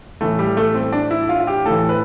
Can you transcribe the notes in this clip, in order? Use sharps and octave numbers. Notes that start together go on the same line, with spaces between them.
A2 E3 A3
G3
A3
C4
D4
E4
F4
F4
G4
A2 E3 A4
B4